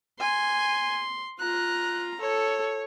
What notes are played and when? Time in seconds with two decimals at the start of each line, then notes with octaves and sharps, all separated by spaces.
0.20 G#5 C6
1.40 F4 A#5 F#6
2.20 A4 C#5